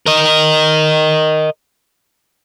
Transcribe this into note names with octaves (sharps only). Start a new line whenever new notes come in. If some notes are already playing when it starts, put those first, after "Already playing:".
A#4 D#5